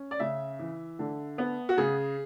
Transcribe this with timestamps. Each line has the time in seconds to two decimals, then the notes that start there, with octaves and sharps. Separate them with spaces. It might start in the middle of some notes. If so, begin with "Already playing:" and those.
Already playing: C#4
0.11 D5
0.20 C#3 E5
0.59 E3
0.99 D3
1.38 B3
1.69 F#4
1.77 C#3 G#4